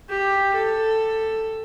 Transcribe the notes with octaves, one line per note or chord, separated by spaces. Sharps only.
G4
A4